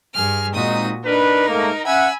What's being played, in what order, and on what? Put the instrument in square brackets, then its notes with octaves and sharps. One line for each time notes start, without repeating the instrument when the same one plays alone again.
[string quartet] G2 G#4 F6
[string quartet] A#2 F#4 D#6 [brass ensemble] G#3 C4 D#4
[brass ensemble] D4 B4 [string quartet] D#4 A#4
[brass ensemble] G#2 A3 A#3
[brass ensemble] C#4 E5 F#5 [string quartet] G#5 B5 E6